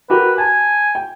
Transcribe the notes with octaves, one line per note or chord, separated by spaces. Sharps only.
F#4 G4 A#4 B4
G#5 A5
G5